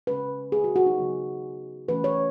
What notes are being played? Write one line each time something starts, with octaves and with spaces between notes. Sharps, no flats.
C#3 G#3 C#4 B4
G#4
F#4
F#4
D#4
C#3 F#3 B3
E3 A3 C#4 B4
C#5